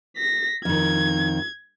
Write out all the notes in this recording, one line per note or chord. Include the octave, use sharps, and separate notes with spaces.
A#6 B6
F2 D#3 G#6